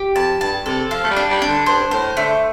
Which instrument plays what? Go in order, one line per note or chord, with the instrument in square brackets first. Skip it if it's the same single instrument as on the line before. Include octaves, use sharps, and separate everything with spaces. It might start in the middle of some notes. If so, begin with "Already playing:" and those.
Already playing: [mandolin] G4
[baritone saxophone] F2 [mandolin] A5
[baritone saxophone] G2 [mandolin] A5
[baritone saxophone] C3 [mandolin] A4
[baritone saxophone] F3 [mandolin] F5
[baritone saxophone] A3
G3
[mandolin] D4
[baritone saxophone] G3
[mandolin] D4
[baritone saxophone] D3
[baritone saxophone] G2 [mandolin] C5
[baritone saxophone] A2 [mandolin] C5
[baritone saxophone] D3 [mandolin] A3